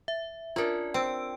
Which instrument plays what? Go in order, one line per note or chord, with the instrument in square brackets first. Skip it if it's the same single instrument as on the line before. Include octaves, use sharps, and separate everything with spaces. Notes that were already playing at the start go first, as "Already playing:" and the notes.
[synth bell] E5
[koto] C#4 D4 [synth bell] F4 A#4
[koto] C4 [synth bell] G5 E6 D7